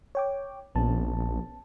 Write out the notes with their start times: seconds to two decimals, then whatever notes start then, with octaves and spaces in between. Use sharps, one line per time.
0.15 C#5 G5 D6
0.75 A#1 B3 C#4 A5